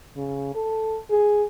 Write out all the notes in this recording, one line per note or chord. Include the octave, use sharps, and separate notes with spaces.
C#3
A4
G#4